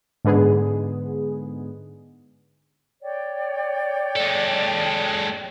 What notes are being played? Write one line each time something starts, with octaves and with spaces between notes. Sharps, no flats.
G#2 D3 G#3 B3 G#4
C#5 D5 G5
G#3 A4